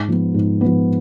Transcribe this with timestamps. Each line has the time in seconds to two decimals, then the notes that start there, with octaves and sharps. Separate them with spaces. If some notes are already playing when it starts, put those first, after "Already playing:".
Already playing: G#2
0.08 F3 B3
0.34 G#2
0.61 F3 B3